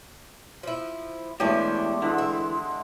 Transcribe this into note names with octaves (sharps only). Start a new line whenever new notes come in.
F3 E4
B2 E3 G#3 A3 C#4 D4 G4
D3 E3 G#3
E4